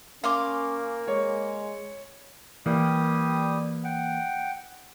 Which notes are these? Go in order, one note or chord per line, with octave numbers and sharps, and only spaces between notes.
A#3 C#4 F5 C6 D6
G#3 C#5
E3 G3 A#3 G4 D#6
F#5 G5